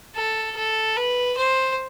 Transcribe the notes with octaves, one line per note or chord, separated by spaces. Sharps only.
A4
A4
B4
C5